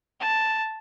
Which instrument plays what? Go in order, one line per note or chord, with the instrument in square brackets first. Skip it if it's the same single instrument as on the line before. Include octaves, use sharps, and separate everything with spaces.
[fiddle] A5